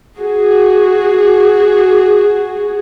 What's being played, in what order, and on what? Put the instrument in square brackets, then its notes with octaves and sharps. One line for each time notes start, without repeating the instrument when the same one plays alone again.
[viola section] F#4 G#4